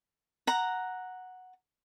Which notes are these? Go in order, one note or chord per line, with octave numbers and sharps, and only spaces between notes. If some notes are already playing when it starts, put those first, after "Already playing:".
F#5 A#5